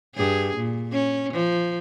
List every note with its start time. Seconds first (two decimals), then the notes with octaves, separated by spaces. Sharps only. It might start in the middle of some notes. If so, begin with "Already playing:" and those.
0.16 G2 G#4
0.57 A#2
0.92 C#4
1.33 F3